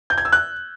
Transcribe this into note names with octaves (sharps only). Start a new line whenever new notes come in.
G6
G#6
E6
F#6